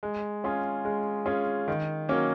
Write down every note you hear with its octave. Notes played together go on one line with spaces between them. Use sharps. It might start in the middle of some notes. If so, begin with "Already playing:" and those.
G#3
C#4 F4 G#4
G#3
C#4 F4 G#4
D#3
F#3 A#3 C#4